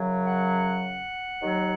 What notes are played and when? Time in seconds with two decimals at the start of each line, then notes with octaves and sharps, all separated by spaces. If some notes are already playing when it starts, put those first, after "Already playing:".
Already playing: F#2 C#3 F#3
0.23 F#5
1.41 D#2 D#3 F#3